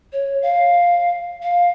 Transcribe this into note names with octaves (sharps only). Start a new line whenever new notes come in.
C#5
F5
F5